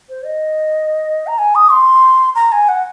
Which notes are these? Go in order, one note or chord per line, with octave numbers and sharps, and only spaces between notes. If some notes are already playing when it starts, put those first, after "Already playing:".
C5
D#5
A#5
G#5
D#6
C6
A#5
G#5
F#5